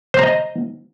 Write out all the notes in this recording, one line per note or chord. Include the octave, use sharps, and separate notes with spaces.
C5 D#5 A#5